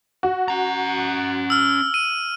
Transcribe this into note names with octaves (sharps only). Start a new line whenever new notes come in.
F#4
C#4 A#5
E6 F6
D#7